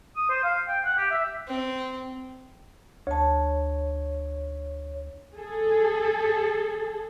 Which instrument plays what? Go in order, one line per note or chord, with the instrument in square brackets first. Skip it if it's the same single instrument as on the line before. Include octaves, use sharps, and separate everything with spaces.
[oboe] D#6
C5
F5
G5
F#5
G4
E5
[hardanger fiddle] C4
[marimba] D2 A5 [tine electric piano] C#5
[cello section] G#4 A4